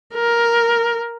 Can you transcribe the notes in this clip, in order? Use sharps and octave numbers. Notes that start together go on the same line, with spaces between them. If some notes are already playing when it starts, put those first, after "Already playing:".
A#4